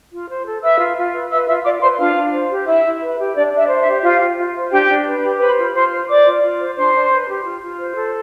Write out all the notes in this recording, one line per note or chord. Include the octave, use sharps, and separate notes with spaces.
F4
C5
A4
B4 E5 E6
F4
F4
B4
B4 E5 E6
F4 E5 E6
F4 D5 D6
B4 C5 C6
D4 F4 F5
D4
C5
G4
E4 E5
E4
B4
G4
D4 D5
D4
E5
C5
E5
G4
F4 C5 F5
F4
F4
C5
D4 G4 G5
D4
B4
G4
B4 C5 B5
F4
F4 C5 C6
C5
C5 D5 D6
F4
F4
C5
D4 C5 C6
D4
B4
G4
F4
F4
C5
A4